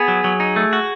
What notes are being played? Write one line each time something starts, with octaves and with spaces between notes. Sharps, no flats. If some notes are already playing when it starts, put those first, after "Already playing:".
Already playing: B3 G#4
F#3
F#3
D#4
A3
F#4